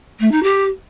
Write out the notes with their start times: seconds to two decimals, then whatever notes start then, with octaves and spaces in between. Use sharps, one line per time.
0.20 A3
0.31 D#4
0.43 G4